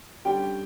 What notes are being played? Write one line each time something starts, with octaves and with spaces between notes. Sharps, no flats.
D3 G3 C#4 G4 G5